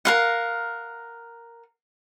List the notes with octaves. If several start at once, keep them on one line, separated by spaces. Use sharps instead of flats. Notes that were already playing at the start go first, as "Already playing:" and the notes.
A#4 F5 F#5